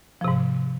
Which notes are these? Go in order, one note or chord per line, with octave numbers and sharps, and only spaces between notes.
G#2 C3 F3